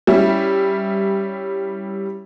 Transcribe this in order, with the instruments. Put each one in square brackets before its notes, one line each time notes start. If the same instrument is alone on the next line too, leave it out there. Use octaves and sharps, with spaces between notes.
[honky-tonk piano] G3 C#4 E4